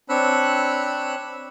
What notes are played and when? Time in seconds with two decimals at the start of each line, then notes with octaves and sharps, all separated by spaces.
0.09 C4 D4 C#5 B5 E6 F#6